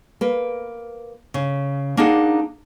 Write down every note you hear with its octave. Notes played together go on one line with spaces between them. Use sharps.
A#3 B4
C#3
A#3 D4 D#4 G#4 F#5